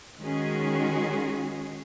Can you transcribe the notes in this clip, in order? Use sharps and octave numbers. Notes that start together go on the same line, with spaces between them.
D#3 G#3 C#4 F#4 G#4